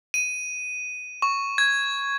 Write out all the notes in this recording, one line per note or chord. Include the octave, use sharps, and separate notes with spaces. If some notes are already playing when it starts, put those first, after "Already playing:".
D#7
C#6
G#6